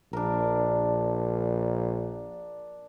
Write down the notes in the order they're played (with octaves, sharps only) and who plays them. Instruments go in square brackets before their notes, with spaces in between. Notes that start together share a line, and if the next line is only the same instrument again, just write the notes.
[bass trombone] A#1 [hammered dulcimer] D4 A#4